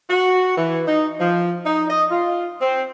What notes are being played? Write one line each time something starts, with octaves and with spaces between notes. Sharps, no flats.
F#4
E3
D#4
F3
D#4
D#5
F4
C4